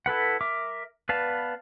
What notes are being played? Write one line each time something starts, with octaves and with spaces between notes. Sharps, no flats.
E4 A4 B4 F#5
A#4 E5 D6
B3 B4 D5 F5 A5